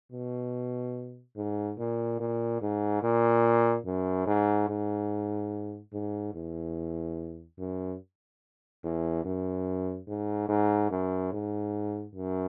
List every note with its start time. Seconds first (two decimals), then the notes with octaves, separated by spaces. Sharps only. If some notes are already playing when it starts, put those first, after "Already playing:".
0.12 B2
1.36 G#2
1.78 A#2
2.20 A#2
2.61 G#2
3.03 A#2
3.85 F#2
4.26 G#2
4.69 G#2
5.93 G#2
6.34 E2
7.59 F#2
8.84 E2
9.25 F#2
10.08 G#2
10.49 G#2
10.91 F#2
11.32 G#2
12.15 F#2